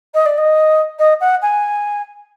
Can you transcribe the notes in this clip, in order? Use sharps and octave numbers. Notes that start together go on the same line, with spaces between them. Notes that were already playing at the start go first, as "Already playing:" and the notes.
D#5
D5
D#5
D#5
F#5
G#5